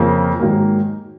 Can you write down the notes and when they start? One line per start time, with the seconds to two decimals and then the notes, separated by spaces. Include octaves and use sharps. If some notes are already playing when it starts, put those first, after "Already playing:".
Already playing: F2 C#3 F3 A#3
0.40 G#2 D#3 F#3 A#3